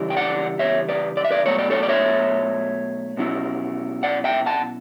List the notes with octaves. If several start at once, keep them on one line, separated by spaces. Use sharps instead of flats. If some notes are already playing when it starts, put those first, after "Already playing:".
Already playing: C#3 E3 G3 E4
G5
D5 F#5
C#5 E5
B4 D5
D5
E5
B4 D5
B2 F#3 A3 C#5
D5
A4 C#5
D5
C#5 E5
B2 F#3 C#4 E4
D5 F#5
E5 G5
F#5 A5